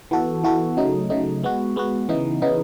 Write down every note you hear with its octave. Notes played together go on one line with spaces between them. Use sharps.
E3 B3 F#4 A4
E3 B3 F#4 A4
C#3 F#3 A3 D#4
C#3 F#3 A3 D#4
G#3 B3 F#4
G#3 B3 F#4
C#3 E3 B3 D#4
C#3 E3 B3 D#4